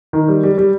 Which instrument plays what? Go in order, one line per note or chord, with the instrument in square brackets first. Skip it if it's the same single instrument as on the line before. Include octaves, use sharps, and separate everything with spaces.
[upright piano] D#3
G3
G3
G3